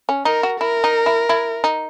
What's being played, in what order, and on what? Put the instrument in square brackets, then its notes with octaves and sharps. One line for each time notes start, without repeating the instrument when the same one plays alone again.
[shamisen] C#4
[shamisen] D#4 [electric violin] A#4
[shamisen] F#4
[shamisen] E4 [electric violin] A#4
[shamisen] D#4
E4
E4
D#4